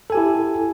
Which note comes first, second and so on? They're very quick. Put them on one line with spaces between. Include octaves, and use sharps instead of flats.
A4 G#5 G4 E4